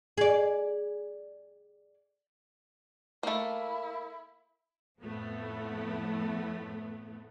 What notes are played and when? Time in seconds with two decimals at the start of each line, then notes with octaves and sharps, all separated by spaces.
0.17 G#4 D5
3.23 A3 A#3 E4
5.00 F2 A2 F3 A3 B3